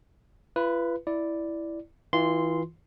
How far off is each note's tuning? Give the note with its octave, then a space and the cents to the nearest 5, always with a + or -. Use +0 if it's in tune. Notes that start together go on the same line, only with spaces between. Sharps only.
F4 -45 B4 +0
E4 +0 D5 +0
E3 -30 F4 +0 C6 -10